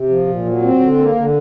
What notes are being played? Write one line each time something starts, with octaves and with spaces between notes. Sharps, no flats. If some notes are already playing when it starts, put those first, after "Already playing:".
Already playing: C3
F3
A#2
F#3
C4
D3
A#3
D3